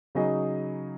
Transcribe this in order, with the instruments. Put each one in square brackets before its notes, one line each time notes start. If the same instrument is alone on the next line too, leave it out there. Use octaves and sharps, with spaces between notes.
[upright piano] C#3 F#3 D#4 G#4 D#5